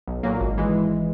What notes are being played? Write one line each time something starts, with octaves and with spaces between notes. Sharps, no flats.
B1
A#2 F#3 A#3
G#1
E3 G#3